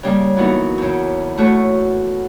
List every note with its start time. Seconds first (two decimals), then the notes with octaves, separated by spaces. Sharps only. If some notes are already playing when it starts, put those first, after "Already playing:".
0.03 C#3 G3 A#3
0.36 E3 F#3 A#3 B3 D#4 E4
0.78 E2 C#3
1.38 A3 F#4 A4 C#5